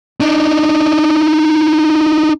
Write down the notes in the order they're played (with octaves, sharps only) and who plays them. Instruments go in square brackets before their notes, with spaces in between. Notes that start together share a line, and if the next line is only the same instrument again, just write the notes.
[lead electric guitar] D4 D#4